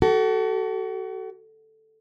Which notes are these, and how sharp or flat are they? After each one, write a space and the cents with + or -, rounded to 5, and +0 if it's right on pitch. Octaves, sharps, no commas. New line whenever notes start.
F#4 +35 A4 +0